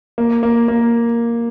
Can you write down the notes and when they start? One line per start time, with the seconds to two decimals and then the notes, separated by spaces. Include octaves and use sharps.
0.18 A#3
0.43 A#3
0.68 A#3